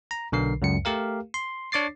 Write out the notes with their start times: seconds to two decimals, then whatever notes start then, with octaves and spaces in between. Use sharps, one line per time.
0.11 A#5
0.32 B1 D3 A#4 C7
0.62 C#2 F#2 C#7
0.85 A3 G4 A#4 F5
1.34 C6
1.72 D4 C#5 D6 A6 C7